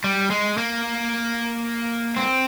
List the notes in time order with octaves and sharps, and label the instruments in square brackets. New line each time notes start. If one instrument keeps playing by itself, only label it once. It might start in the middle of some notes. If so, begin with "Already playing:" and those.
[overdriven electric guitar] G3
G#3
A#3
C4